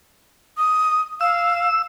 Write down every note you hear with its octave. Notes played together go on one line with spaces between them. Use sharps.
D#6
F5 E6